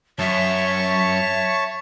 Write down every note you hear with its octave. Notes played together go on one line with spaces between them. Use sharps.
F#2 C#5 E5 A5 C#6